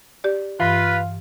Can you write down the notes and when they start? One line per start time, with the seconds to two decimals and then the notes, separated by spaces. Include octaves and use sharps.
0.24 G4 D5
0.60 G2 E3 F4 B4